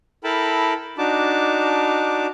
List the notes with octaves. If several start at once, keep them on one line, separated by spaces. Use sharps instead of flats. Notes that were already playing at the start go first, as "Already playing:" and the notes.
E4 A4 A#4 G5 A5 B5
D4 D#4 F#4 A5 D6